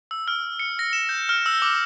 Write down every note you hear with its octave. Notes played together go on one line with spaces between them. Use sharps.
E6
F6
C#7
A#6
E7
G6
F6
E6
D6